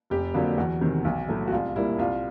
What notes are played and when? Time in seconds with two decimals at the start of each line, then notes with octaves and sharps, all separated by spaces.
0.10 F1 G4
0.34 F2 D3 F#3 A#3
0.58 E2 F#4
0.81 C3 D#3
1.05 B1
1.28 A2 F#3 A3
1.48 F#4
1.52 C2 F4
1.75 A#2 G3 A#3 E4
1.99 C2 F4